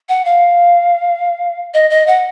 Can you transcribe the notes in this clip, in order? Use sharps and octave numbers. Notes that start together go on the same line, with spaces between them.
F#5
F5
D#5
D#5
F#5